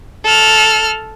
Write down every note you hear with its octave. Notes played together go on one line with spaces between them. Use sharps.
A4 F6